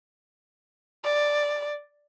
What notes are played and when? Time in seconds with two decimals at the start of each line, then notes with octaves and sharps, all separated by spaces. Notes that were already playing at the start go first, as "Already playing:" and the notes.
1.04 D5